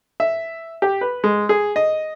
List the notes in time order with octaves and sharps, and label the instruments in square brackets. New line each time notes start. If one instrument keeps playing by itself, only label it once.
[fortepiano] E5
G4
B4
G#3
G#4
D#5